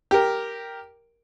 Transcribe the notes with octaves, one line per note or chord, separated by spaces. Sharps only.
G4 A#4